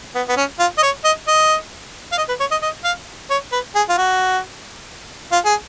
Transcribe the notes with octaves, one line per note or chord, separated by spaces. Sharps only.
B3
B3
C#4
F4
D#5
C#5
D#5
D#5
F5
D#5
B4
C#5
D#5
D#5
F5
C#5
B4
G#4
F4
F#4
F4
G#4